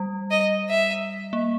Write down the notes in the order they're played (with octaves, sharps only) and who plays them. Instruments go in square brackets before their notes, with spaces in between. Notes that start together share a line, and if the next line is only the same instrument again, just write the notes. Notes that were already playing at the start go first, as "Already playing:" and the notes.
Already playing: [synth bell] G3
[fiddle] D#5
E5
[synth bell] A#3